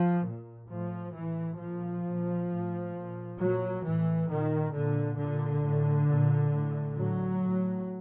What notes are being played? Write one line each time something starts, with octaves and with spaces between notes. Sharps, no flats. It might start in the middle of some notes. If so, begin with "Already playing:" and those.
Already playing: F3
A#2
A2 F3
A2 E3
A#2 F3
A#2
A2
A#2
A#2 F#3
A2 E3
A#2 D#3
A#2 D3
A#2 D3
A2
A#2
A2
A2 F#3
A2